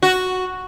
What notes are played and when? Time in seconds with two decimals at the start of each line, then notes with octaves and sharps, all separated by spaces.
0.03 F#4